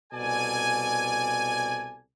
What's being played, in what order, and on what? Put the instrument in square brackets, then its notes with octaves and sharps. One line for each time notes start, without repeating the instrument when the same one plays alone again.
[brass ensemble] C2 B2 A4 D5 G#5